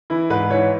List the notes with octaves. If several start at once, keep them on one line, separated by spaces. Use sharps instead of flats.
E3 E4
G#2 B4
E3 C#5